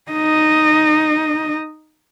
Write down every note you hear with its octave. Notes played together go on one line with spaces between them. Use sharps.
D#4 D#5